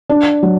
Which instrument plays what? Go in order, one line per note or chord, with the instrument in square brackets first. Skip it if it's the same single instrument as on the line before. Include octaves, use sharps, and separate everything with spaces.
[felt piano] D4
F#3